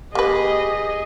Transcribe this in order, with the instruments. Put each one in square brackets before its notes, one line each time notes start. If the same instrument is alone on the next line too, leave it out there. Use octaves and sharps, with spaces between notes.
[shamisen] A#3 B4 [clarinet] G4 [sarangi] G#4 [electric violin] D#5